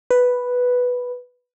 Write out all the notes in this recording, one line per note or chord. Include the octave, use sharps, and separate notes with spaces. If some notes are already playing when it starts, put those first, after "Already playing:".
B4